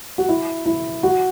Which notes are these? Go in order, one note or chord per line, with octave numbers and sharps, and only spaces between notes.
F#4
E4
E4
F#4